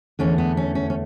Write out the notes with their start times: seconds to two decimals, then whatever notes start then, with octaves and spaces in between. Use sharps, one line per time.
0.19 E2 D3 A3 C#4
0.38 B3
0.57 C#4
0.75 C#4
0.90 C#4